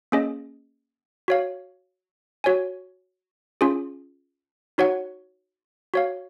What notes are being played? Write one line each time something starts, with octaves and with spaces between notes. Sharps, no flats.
A#3 C#4 G#4 D#5
F#4 C#5 F5
F#4 C#5 G#5
C#4 F4 G#4
D#4 F#4 C#5 F#5
F#4 C#5 F5